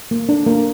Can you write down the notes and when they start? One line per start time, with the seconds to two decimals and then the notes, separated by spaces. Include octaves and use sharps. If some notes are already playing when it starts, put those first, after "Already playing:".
0.11 A#3
0.29 D4
0.46 A#3